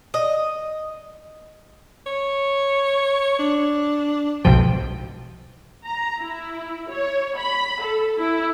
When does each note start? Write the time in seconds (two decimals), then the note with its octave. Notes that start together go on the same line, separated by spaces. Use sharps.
0.14 D#5
2.06 C#5
3.39 D4
4.45 B1 G#2 F3 G5
5.85 A#5
6.20 E4
6.90 C#5
7.37 B5
7.82 A4
8.19 E4